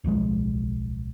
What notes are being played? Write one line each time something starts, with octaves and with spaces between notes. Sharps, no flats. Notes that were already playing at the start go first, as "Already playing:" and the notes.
D1 B1 F3 G#3